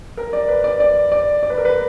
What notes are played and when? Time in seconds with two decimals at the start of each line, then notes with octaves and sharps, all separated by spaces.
0.17 A#4
0.33 D5
0.49 B4
0.64 D5
0.80 D5
1.12 D5
1.43 D5
1.50 B4
1.58 A#4
1.65 B4